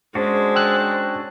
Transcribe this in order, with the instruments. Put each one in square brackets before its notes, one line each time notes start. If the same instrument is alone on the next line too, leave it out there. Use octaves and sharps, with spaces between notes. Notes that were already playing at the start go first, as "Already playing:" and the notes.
[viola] G#3 [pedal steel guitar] C#4 D4 F#4 [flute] C5
[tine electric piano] G5 E6 F#6